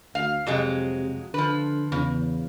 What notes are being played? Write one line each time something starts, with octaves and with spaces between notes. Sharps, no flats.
D2 F5
F2 C3 F#3 G#3
D3 F3 B4
E2 C#3